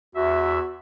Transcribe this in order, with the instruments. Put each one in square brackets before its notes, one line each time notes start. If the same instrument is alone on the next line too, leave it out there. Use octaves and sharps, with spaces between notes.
[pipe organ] E2 E5 [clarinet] F#4